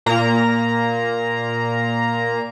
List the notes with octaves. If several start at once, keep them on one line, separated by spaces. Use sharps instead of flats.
A#2 A#3 A#5